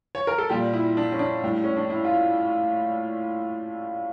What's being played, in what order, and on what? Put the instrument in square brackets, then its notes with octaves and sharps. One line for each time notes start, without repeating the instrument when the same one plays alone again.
[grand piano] C#5
A#4
A4
A#2 G3 G4
E4
D4
C#4
D4
A2 G3
C#4
D4
E4
F4